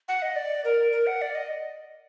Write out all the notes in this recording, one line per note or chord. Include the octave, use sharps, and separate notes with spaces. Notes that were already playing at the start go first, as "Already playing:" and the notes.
F#5
D#5
D5
A#4
A#4
F#5
D5
D#5